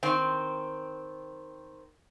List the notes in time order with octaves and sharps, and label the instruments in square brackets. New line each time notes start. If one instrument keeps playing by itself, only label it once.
[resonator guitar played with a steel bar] D#3 C4